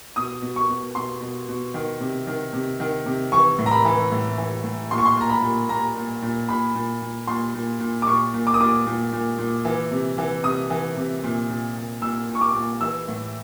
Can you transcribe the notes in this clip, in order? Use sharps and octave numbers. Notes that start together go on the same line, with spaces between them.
B2 D#6
B2
C#6
B2
B2 C6
B2
B2
D#3
C3
D#3
C3
D#3
C3
E3 C#6
A2
A#5
B5
E3
A2
E3
A2
A#2 C6
C#6
C6
A#2 A#5
B5
A#2
A#2 A#5
A#2
A#2
A#2 B5
A#2
A#2
A#2 C6
A#2
A#2
D6
A#2 C#6
A#2
D6
D#6
A#2 D6
A#2
A#2
A#2
E3
C3
E3
C3 D#6
E3
C3
A#2
A#2
A#2
A#2 E6
A#2
C#6
D6
A#2
E3 E6
A2